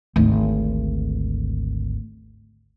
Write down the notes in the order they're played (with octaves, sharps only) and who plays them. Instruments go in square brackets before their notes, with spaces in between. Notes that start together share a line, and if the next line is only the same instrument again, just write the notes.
[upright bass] G#1 D2